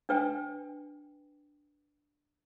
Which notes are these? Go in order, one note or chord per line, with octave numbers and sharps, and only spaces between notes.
D4 B4 G5 G#5